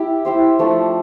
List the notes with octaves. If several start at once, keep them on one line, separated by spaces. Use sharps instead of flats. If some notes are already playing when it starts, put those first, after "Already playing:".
Already playing: E4 G4
E4 G4 C5
F3 A3 D4